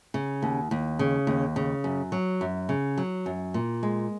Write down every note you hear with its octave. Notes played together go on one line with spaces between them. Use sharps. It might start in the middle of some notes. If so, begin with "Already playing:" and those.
C#3
D#2
D#2
C#3
D#2
C#3
F#2
F#3
F#2
C#3
F#3
F#2
A#2
G#3